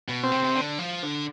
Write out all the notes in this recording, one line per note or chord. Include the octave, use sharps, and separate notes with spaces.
B2
C4
C3
C3
D3
F3
D3